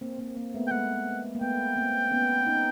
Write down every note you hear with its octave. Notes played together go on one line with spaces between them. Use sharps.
A#3 C4
A#3 C4
A#3 C4
A3 B3
G5
G#3 A#3 F#5
A#3
A3 B3 G5
A#3 C4
B3 C#4
C#4 D#4